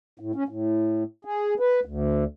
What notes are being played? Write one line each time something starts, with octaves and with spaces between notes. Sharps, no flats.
A2
C#4
A2
G#4
B4
D2